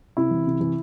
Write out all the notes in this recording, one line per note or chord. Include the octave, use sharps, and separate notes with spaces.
C3 E4
E3
C3
E3